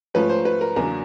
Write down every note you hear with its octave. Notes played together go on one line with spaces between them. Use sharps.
G#2 F3 A3 C#4 B4
C5
B4
A#4
E2 C#3 F#3 A#3 D4 A#4